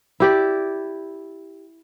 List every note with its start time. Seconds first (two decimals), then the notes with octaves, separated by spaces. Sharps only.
0.20 E4 G4 D5